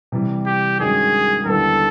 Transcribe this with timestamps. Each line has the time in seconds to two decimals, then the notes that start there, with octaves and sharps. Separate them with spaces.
0.12 C3 E3 G3
0.46 G4
0.80 G2 D#3 G#3 C#4 F#4 G#4
1.46 D#2 D3 G3 B3 E4 A4